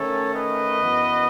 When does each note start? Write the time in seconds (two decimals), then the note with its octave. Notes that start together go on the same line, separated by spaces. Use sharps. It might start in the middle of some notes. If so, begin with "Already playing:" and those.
Already playing: D#3 A3 C#4 A4 C#5
0.34 B4 D#5
0.80 F#2 E3 B3